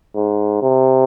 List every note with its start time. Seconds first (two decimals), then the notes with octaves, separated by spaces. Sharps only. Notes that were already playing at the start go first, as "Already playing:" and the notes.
0.15 G#2
0.62 C3